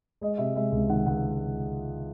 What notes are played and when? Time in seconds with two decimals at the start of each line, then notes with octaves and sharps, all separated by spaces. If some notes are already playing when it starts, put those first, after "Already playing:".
0.21 G#3 D#5
0.38 C3 E5
0.56 G#3 E5
0.72 C#2
0.89 D#3 F#5
1.06 C#2 F#5